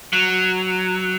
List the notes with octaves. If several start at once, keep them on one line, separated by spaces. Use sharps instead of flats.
F#3